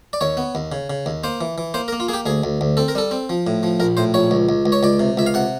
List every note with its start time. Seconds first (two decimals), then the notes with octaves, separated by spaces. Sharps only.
0.13 D5
0.21 D#2 C#5
0.37 B3
0.55 D#2
0.72 C#3
0.90 C#3
1.06 D#2
1.24 A#3 C5
1.41 E3
1.58 E3
1.74 A#3 C5
1.88 A#4
1.93 A#3
2.00 F4
2.08 A#3 G4 G#4
2.26 D2 G#4
2.44 D2
2.61 D2
2.77 C4 A4
2.88 A#4
2.95 G3 A4
3.11 C4
3.30 F3
3.47 A2
3.63 F3
3.80 A#1 A#4
3.97 A2 C5
4.14 A#1 C#5
4.31 C#2
4.49 C#2
4.66 C#2
4.72 C#5
4.83 C#2 D5
5.00 C3
5.17 C#2 E5
5.26 F5
5.34 C3 F#5